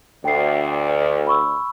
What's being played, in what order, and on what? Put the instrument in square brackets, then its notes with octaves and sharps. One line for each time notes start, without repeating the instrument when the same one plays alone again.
[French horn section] D2 [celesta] G5 C7
[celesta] B5 C#6 E6